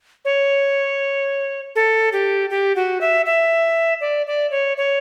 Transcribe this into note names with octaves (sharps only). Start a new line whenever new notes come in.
C#5
A4
G4
G4
F#4
E5
E5
D5
D5
C#5
C#5